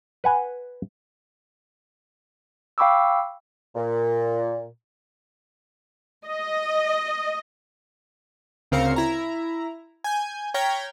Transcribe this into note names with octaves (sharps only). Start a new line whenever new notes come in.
B4 F#5 G#5
F5 G5 B5 C#6 D6 E6
A#2
D#5
D2 C#3 C4 A#4 F5 C#7
E4 A#5
G#5 G6
C#5 G5 A#5 F6 G#6 B6